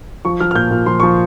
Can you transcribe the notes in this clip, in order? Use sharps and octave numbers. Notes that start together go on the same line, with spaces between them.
F3 C#6
F3 F6
F6
A#2 G6
A#2
F3 C6
F3 C#6